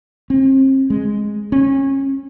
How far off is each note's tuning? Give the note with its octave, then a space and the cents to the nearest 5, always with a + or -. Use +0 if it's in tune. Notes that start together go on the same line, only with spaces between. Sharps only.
C4 +35
G#3 +0
C#4 -25